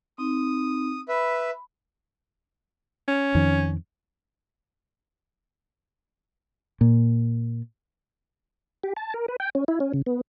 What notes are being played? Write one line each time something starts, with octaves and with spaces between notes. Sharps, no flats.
C4 D#4 D#6
B4 E5 B5
C#4
F2 D#3
A#2
G4
A5
A#4
B4
G5
C#4
E4
C#4
C#3
B3